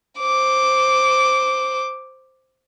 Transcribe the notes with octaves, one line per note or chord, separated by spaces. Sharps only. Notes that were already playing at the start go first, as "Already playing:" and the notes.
C5 D6